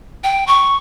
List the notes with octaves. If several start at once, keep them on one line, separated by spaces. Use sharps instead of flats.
G5
C#6